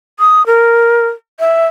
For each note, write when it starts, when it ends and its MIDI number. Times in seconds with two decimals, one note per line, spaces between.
0.19 0.45 87
0.46 1.08 70
1.40 1.67 76